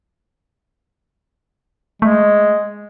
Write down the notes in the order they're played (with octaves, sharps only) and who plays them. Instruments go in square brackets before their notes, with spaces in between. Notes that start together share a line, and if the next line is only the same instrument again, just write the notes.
[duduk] G#3 [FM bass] A3